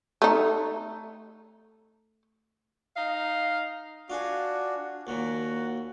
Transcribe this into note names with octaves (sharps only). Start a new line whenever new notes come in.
A3 D#4
D#4 D#5 F5
D4 F4 F#4 G#4
D#2 A#2 F#4